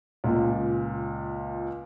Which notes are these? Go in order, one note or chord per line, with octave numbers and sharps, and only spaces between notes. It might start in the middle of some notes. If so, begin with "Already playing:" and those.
C#2 A#2